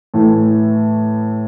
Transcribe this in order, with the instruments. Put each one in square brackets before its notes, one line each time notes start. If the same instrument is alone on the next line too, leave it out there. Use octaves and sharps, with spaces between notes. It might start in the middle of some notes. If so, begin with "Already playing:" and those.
[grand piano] A2 E3 A3